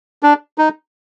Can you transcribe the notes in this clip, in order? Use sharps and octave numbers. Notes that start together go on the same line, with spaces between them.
D4
D#4